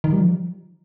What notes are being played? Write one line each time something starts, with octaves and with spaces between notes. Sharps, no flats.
D#3
G3
F3